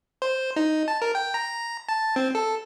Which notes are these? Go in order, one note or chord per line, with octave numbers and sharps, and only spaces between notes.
C5
D#4
A5
A#4
G5
A#5
A5
C4
A4